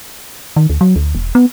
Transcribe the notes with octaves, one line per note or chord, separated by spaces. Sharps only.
D#3
D2
F#3
D2
E1
B3